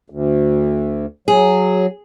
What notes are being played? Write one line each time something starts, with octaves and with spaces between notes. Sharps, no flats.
D2
F#3 G#4